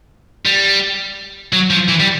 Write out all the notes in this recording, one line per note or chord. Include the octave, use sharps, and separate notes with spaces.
G3
F#3
F3
E3
G3